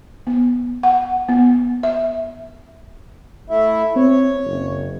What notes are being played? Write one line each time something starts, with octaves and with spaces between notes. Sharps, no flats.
B3
F#5
B3
E5
A3 E4 E5
C4 C#5
F#1